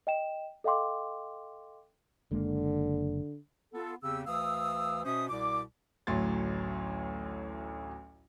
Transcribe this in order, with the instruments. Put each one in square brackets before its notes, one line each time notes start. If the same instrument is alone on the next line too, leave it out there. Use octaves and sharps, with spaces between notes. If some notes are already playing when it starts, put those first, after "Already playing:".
[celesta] D#5 G5 E7
A4 D#5 F5 G5 C6 D6
[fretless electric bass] F#1 G#3 A#3 [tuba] D3
[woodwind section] B3 F4 A4
E2 C#3 C4 G4 E6
D2 E3 F5 D#6 E6
B2 C#4 C5 E5 D#6
C2 B2 D5 D6
[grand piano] A1 D2 A2 F#3 C6 A6